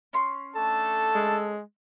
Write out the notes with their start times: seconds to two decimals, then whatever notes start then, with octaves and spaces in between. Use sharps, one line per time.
0.13 C#4 C6 C#6
0.55 A3 D4 A4 A5
1.15 G#3